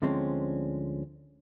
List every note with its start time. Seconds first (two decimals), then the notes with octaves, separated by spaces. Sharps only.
0.02 D2 D3 F3 G#3 C4 C#4